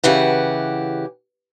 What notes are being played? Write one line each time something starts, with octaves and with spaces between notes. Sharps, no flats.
C#3 E3 G4 F#5